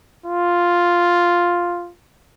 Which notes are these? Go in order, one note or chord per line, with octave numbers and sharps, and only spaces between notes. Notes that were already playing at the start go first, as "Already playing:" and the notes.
F4